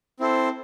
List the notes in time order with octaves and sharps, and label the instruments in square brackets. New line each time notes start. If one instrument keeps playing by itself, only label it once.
[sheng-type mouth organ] C4 E4 A4 C5